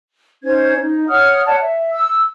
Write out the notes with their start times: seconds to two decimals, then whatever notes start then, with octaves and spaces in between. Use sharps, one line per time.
0.44 C#4 D#4 C5 G#6
0.81 D#4
1.09 C#5 F#5 D#6 F6
1.46 C#5 D5 F#5 A5
1.61 E5
1.92 E6